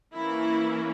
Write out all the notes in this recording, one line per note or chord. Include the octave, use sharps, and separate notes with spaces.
E3 A#3 C#4 E4